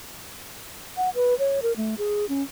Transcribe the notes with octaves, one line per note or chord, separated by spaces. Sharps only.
F#5
B4
C#5
A#4
A3
G#4
C#4